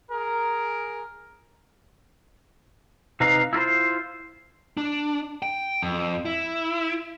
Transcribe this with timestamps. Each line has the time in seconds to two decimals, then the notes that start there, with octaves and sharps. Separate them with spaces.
0.11 G#4 A#4
3.20 C3 D#4 B4 D#5 F5
3.53 E4 F4 A#4 C5
4.77 D4
5.43 G5
5.83 F2
6.25 E4